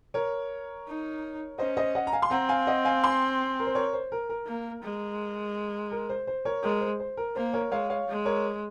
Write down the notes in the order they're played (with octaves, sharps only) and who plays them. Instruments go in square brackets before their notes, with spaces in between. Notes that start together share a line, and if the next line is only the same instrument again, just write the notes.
[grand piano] A#4 C#5
[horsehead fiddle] D#4
[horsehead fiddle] C#4 [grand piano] C5 D#5
[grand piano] C5 D#5
D#5 F#5
A#5
F5 G#5
C6
[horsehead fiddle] C4 [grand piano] F#5 A#5
[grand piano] F5 G#5
D#5 F#5
F5 G#5
G#5 C6
A#4
C5
A#4 C#5
C5
A#4
A#4
[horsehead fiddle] A#3
G#3
[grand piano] A#4
C5
C5
A#4 C#5
[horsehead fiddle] G#3 [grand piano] A#4
[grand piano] C5
C5
A#4
[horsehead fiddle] A#3 [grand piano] C5
[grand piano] A#4 C#5
[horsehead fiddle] G#3 [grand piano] C#5 F5
[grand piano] C#5 F5
[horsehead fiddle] G#3
[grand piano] A#4 C#5